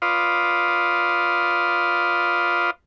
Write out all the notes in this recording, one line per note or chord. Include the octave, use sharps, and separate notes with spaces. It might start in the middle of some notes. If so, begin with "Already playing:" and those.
F4 B4 D5 F5 C6 D#6